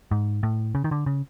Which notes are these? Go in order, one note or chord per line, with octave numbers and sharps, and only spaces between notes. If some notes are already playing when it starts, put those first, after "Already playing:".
G#2
A2
C#3
D#3
D3
C#3